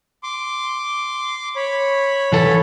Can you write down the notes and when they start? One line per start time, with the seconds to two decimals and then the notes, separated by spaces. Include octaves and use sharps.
0.23 C6 D6
1.56 C#5 B5
2.33 E3 A4